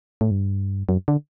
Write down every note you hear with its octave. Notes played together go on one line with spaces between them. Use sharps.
A2
G2
F#2
D3